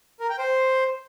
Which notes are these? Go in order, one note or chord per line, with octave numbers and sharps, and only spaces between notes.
A#4
G5
C5